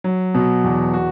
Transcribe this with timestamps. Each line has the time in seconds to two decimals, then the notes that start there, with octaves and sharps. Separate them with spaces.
0.04 F#3
0.34 B2
0.64 E2
0.94 F#4